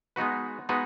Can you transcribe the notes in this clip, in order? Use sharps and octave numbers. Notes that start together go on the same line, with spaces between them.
G#3 B3 D#4 F#4 B4
G#3 B3 D#4 F#4 B4